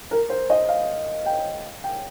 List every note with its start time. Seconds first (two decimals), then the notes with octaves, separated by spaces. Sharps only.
0.11 A#4
0.30 C5
0.50 D#5
0.69 F5
1.26 G5
1.84 G5